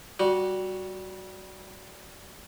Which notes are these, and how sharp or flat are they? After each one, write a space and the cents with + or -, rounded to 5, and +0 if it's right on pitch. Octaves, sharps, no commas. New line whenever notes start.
G3 -15 F#4 +0